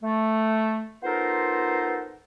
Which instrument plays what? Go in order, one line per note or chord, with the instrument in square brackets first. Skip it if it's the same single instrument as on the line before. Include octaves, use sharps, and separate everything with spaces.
[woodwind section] A3
B3 D#4 F4 A4 A#4 C5